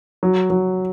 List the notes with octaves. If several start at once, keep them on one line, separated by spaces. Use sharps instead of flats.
F#3
F#3